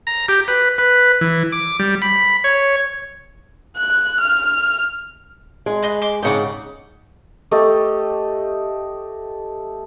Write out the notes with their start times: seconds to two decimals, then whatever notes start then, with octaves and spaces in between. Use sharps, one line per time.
0.07 A#5
0.28 G4
0.48 B4
0.78 B4
1.21 E3
1.52 D6
1.79 G3
2.02 B5
2.44 C#5
3.77 F#6
4.20 F6
5.66 G#3
5.83 B4 D#5 C6
6.02 C6 D6
6.22 G#2 C#3 D5 F#5 G5
7.51 A3 G4 A4 D#5